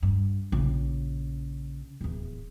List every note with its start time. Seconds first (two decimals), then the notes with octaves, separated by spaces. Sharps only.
0.02 G2
0.52 A#1 C#3
2.01 D1 E2